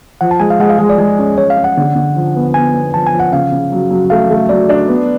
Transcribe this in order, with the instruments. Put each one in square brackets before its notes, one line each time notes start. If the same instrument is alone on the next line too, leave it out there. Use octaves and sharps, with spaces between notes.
[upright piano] F3 [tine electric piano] F#5
[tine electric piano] A5
[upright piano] G#3 [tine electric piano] G#5
[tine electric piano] F5
[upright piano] G#3 [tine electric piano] F#5
[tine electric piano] F5
[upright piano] G#3
[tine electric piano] D5
[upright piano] G#3
C#4
[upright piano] G#3 [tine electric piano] C#5
[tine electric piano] F5
[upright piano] C#4
[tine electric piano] F#5
[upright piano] D3
D3
F3
B3
[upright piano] B3 [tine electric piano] G#5
[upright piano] B3
[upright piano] F3 [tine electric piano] A5
[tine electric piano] G#5
[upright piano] F3
[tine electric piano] F#5
[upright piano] C#3 [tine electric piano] F5
[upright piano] C#3
F#3
F#3
[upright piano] A3 [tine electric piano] F5
[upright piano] A3
[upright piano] F#3 [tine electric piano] D5
[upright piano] D4
B3